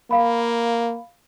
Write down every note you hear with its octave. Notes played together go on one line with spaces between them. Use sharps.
A#3 F5 B5